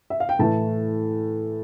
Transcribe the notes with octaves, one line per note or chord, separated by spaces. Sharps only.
E5
F5
G5
A2 E3 A3 A5